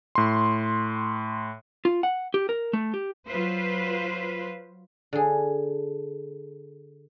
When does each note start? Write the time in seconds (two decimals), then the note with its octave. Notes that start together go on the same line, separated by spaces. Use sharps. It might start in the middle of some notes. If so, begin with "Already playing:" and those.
0.15 A2 C6
1.85 F4
2.03 F#5
2.34 G4
2.49 A#4
2.73 A3
2.94 G4
3.27 F#3 F4 B4 C5
5.13 D3 G#4